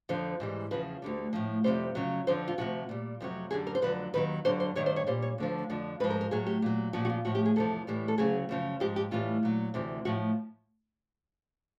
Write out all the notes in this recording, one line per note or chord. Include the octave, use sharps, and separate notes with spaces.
F2 D3 F3 C5
G#2 E3 G3
E2 C#3 F3 B4
D2 D3 G3
A2 F3
F2 C3 E3 G3 C5
F2 C#3 F#3
F2 D3 F3 C5
F4
D2 C3 F3 F#4
A#2 G3
F2 C3 D#3 F#3
F#2 D3 G3 G#4
A#4
C5
F2 D3 F#3 B4
D#2 D#3 F#3 B4
G2 D3 F#3 C5
C5
G2 D#3 G3 C#5
C5
C#5
A#2 G3 C5
C#5
D2 D3 F3
F2 D3 F3
G#2 F3 B4
A#4
A#4
A2 F#3 G#4
G4
A#2 F#3
A#2 F3 F#4
F#4
F4
A2 F3 F#4
G4
G#4
E2 C3 F3 A4
A2 E3 G3
A4
D2 C#3 F#3 G#4
F#2 C#3 F3
G#2 F3 G4
G4
A2 E3 G3 F4
A#2 F#3
D2 C3 E3
A2 F3 F#4